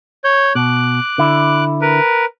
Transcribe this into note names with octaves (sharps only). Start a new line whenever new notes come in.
C#5 G6
B2 D6 F#6
D3 E4
A#4 B4